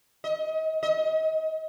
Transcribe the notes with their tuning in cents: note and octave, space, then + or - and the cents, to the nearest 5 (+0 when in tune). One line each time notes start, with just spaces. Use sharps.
D#5 +30
D#5 +30